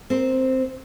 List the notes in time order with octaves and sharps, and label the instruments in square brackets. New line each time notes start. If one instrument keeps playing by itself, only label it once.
[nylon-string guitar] C4 A#4 C5